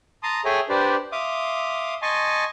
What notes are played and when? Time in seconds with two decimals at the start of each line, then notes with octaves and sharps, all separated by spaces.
0.23 A5 A#5 C6 D#6
0.45 G#4 A4 C#5 E5 G5 G#5
0.69 D4 G4 B4 C5 D5
1.12 E5 F5 C6 D6 D#6
2.02 D#5 G#5 A5 C6 C#6